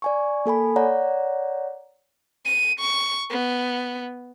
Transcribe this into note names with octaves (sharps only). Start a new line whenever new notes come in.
D5 G#5 C#6
A#3 A4 G#5 B5
C#5 D5 F#5 A#5
D#7
C#6
B3